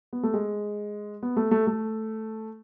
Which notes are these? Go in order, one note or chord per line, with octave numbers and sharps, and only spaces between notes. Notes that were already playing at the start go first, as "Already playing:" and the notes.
B3
A3
G#3
B3
A3
A3
A3